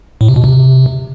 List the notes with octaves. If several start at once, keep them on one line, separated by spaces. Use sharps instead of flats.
A2
C3
B2
C3